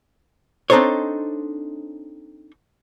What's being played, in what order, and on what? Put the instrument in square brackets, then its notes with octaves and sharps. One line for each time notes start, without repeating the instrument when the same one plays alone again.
[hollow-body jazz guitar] C4 D4 D#4 A4 C5 C#5